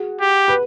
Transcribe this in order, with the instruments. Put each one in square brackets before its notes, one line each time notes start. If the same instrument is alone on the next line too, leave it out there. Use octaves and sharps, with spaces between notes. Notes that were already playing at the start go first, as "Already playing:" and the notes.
Already playing: [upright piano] F#4 G#4
[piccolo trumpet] G4
[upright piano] B4